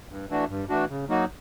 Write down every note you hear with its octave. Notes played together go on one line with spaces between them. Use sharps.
G2
E3 A3 D4 F#4
G2
E3 A3 D4 F#4
C#3
F#3 A#3 D#4 F#4